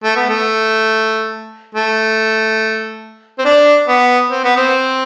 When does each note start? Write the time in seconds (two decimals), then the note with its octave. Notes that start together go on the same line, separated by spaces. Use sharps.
0.04 A3
0.16 B3
0.29 A3
1.75 A3
3.39 C4
3.45 D4
3.88 B3
4.31 C4
4.44 B3
4.57 C4